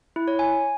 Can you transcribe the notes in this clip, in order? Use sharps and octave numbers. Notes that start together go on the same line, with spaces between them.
E4
C#5
G#5